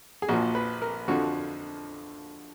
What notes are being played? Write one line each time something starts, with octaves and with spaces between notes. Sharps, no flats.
G#4
A#1 A#2 F3 F#4
B4
A#4
F2 D3 F3 F#4